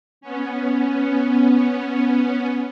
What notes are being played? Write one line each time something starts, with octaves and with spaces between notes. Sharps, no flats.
B3 C#4